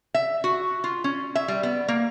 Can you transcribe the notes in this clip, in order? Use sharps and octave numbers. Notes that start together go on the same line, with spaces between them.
E5
F#4
F4
C#4
E5
G3
B3
A#3